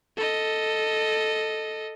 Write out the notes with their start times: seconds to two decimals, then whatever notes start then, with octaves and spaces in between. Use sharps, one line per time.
0.17 A4 D#5